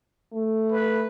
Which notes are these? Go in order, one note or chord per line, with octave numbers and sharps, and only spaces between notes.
A3
B4